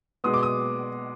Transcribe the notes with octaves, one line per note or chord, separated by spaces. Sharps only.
B2 G#3 B3 D#6
D6
D#6